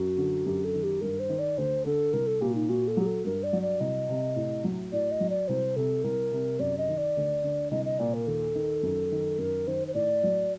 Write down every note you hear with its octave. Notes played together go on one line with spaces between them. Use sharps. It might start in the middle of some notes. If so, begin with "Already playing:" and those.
Already playing: F#2 F#4
D3
F#2 G4
A4
D#3
G4
G2 A#4
C5
D#3
D5
D2 C5
D3 A4
C2 A#4
A4
A#2 G4
F#4
D#4
A#2 F#4
A4
F#3 G4
A4
G2 A#4
D5
F#3
D5
C2 D#5
C3
A2
F#3
A2 D5
D#5
F#3
D5
C2 C5
C3 A4
C2 A#4
C3
F#2 D5
D#5
D#3
D5
D2
D3
C2 D#5
D#5
A#2 D5
A#4
D#2 A4
D#3
F#2
D#3
F#2 A#4
D#3 C5
C5
A2 D5
F#3